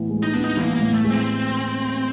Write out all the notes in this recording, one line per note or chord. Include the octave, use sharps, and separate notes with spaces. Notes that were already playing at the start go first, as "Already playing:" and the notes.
Already playing: A2 E3 B3
G#3
D#4
B3 D4
D#4
E3 A#3
A#3
A2
A3
G#3
C4